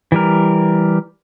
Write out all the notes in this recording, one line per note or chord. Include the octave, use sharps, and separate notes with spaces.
E3 G3 A#4